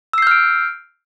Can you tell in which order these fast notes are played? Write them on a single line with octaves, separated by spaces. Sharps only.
E6 C7 G6 F6 D7